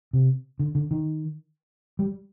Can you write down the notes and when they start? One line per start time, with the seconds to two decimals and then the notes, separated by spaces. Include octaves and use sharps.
0.13 C3
0.59 D3
0.75 D3
0.91 D#3
1.99 G3